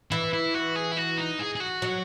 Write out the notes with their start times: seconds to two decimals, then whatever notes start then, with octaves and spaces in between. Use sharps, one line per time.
0.11 E3 E4
0.33 E4
0.54 F#4
0.76 G#4
0.92 E4
0.97 F#4
1.18 D#4
1.39 G#4
1.55 G#4
1.60 F#4
1.82 F#3